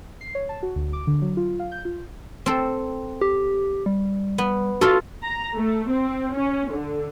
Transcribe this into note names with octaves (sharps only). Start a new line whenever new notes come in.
C7
C#5
A5
F#4
D2
D6
D3
F#3
F4
F5
G6
F4
C4 A4
G4
G3
B3
F4 F#4 A4
A#5
A3
C4
C#4
D3